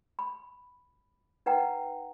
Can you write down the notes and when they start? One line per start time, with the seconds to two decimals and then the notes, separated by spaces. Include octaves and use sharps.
0.19 B5
1.46 D#4 B4 F#5 G5 A#5